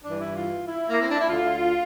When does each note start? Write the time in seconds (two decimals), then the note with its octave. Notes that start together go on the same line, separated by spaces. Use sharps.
0.04 G2 E3 D4
0.20 E4
0.35 F4
0.67 E4
0.90 A#3
0.99 C4
1.09 D4
1.20 E4
1.29 D2 D3 F4